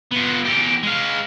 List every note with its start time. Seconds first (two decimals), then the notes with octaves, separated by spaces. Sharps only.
0.12 B3 F4
0.46 E2 G4
0.83 G#3 F5